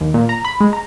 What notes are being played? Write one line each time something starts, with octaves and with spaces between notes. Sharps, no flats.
D#2
A#2
A#5
B5
G#3
A#5